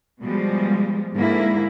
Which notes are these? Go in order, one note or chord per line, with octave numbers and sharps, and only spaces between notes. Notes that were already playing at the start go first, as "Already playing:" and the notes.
B2 F3 G3 G#3
G#2 D3 A#3 E4